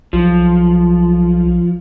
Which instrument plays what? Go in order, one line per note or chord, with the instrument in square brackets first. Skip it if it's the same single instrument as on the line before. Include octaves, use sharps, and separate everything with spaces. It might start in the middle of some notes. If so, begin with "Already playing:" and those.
[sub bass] B1 [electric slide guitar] F3